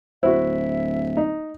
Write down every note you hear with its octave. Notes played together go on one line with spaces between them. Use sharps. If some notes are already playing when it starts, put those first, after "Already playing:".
D1 E4 F#4 C5 E5
D#4